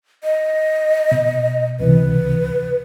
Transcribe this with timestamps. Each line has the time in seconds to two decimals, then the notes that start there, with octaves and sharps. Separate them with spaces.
0.24 D#5
1.12 B2
1.80 C#2 C3 E3 B4